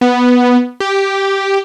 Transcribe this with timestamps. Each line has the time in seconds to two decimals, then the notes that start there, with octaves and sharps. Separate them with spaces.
0.01 B3
0.80 G4